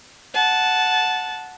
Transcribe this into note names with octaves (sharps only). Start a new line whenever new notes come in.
F#5 A5